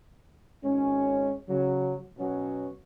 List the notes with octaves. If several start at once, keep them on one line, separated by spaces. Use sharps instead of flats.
G#1 G#3 C#4
C#3 F#3
B2 F#3 B3 C#4 F#4